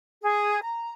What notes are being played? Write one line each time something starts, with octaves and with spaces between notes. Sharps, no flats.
G#4
A#5